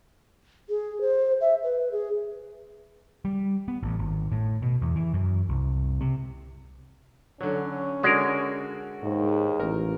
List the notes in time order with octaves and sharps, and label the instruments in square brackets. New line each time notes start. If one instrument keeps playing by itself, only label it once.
[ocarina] G#4
C5
E5
B4
G#4
[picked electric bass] G3
B3
A1
G#1
A2
B2
E2
E3
F#2
C2
C3
[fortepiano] D3 F#3 [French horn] C#4
[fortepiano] D3 F#4 D5 [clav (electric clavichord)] G#3 A#4
[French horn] D#2 [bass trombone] G#2
[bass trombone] A1 [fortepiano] A#4